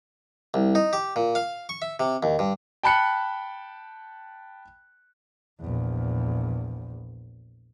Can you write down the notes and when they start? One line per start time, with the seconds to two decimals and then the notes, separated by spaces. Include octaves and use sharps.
0.54 C2
0.75 D#4
0.93 G4
1.16 A#2
1.35 F5
1.69 C#6
1.82 E5
2.00 C3
2.23 D#2
2.39 G2
2.83 G5 A5 B5 F#6 C#7
5.60 A#1 E2